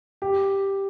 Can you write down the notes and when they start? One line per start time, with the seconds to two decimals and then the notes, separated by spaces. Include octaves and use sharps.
0.22 G4